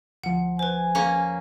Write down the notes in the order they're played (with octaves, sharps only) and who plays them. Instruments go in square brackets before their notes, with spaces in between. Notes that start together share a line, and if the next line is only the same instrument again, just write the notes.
[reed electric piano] D2 F3 [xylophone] F#5
[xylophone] B4 C5 [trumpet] G#5
[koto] A#3 C#4 [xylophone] A#5